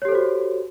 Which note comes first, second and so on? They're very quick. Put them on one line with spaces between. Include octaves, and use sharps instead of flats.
C#5 G4 A4 C5 F#4